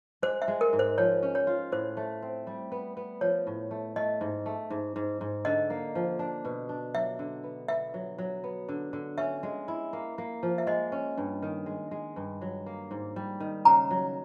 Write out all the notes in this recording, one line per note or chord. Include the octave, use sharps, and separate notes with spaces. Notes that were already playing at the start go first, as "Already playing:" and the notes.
G#3 C5
E5
G#3
A#4
G#2
C5
F3 C#5
C#4
C#5
F4
A2 C5
A3
C4
G3
B3
B3
F3 C#5
A2
A3
A3 D#5
G#2
A3
G#2
G#2
G#2
D3 D#5
A#3
F3
D4
B2
D4
F#3 E5
D3
B3
B3 E5
F#3
F#3
B3
D3
D3
C#4 E5
G#3
E4
A#3
A#3
F3
E5
G#3 D#5
C#4
G2
D#3
G#3
G#3
G2
F#3
A#3
G#2
G3
D#3
C#3 A#5
F#3